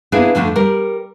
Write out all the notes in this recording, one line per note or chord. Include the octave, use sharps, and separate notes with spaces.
A#3 B3 D4 E4 G#4 B4
F2 D3 F3 A3 C#4 D4
G3 A#4